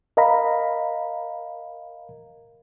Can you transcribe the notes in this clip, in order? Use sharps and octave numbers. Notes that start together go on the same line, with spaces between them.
A#4 D#5 F5 A#5 B5